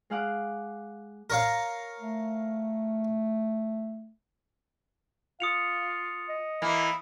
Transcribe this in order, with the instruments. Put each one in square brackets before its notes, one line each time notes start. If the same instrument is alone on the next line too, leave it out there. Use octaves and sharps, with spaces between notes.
[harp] G#3 G#4 F5 F#5 D6
[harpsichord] A#4 C#5 F5
[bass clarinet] A3
[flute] F4 [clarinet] F5 [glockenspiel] D#6 C#7 F7
[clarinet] D#5
[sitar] E3 A#3 [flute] B5